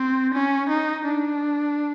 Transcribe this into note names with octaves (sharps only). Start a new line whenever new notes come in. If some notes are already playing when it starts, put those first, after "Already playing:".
Already playing: C4
C#4
D#4
D4